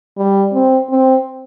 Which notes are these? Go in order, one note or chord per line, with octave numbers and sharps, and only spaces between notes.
G3
C4
C4